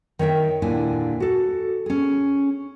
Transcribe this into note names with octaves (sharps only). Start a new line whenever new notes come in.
D#3 C#5 E5 G5
D#2 A#2 D3 E4 G#5
F#4 A4
C#4 G#4